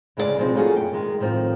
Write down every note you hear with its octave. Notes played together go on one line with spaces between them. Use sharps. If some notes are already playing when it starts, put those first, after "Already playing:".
D2 C#3 G#3 C#4 A4 D5
B2 F3 G#3 C4 D#4 G4
A3 A#3 C#4 F4 F#4 G#4
F#2 G5
D#3 G#3
A2 D#3 F3 C4